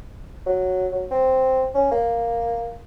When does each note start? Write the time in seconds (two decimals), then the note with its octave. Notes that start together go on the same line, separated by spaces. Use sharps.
0.46 F#3
0.92 F#3
1.11 C4
1.75 C#4
1.91 A#3